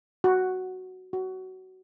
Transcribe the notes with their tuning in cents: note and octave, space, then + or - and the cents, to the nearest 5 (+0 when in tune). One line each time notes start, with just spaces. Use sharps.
F#4 +5
F#4 +20